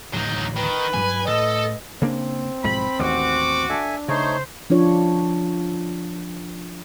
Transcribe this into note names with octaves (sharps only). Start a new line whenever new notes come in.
D1 A1 D#2 F#3 D#4
D#3 B4
G2 F#3 G3 G#5
A2 A4 D#5
C#3 A#3 C4 D4
B1 G#2 F3 B5
A1 D#2 F#4 D6
D4 A4 E5 G#5
C#3 A3 D#4 C5 C#5
F3 D4 F4 C#5